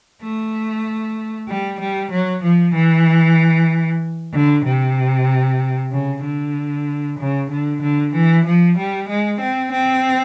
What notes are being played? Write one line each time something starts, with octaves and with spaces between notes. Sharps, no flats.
A3
G3
G3
F#3
F3
E3
D3
C3
C#3
D3
C#3
D3
D3
E3
F3
G3
G#3
C4
C4